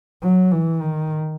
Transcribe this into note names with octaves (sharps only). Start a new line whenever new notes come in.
F#3
E3
D#3